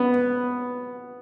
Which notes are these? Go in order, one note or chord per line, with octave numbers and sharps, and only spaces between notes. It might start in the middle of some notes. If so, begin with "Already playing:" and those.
Already playing: B3